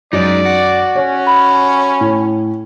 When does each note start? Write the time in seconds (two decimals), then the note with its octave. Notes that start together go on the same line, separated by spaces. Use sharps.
0.13 F#2 G#3 D#4 D5
0.45 F#4
0.95 C#4 C#5
1.27 B5
2.01 A2